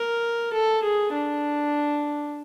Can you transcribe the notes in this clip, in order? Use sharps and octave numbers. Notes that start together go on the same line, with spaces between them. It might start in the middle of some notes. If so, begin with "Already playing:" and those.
Already playing: A#4
A4
G#4
D4